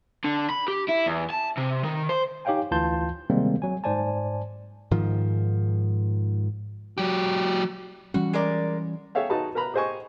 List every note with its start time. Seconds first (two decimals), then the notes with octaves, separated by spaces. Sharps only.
0.25 D3
0.50 B5
0.68 G4
0.88 E4
1.06 E2
1.30 A5
1.58 C3
1.84 D#3
2.09 C5
2.45 D#4 G4 C#5 F5 G5 G#5
2.71 D2 E3 F4 A5 C6 G6
3.30 C3 D#3 G3 G#3 A#3 C4
3.62 F#3 G#5
3.84 G#2 C5 D5 G#5 A5
4.91 G#2 D#3 F3
6.98 F#3 G4
8.14 E3 G3 C#4 F#4
8.33 G#3 A#4 D5
9.15 G#4 A4 C#5 E5 F5 G5
9.30 D#4 F#4 G#4 B4 A5 B5
9.55 A#4 B4 A#5 B5
9.74 G4 G#4 C5 D#5 G#5 C#6